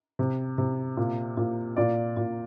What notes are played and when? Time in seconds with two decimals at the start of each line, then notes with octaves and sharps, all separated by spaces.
0.19 C3
0.58 C3
0.97 A#2
1.37 A#2
1.76 A#2 D5
2.17 A#2